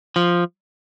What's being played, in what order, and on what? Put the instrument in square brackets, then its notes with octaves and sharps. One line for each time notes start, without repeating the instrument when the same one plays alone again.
[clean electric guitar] F3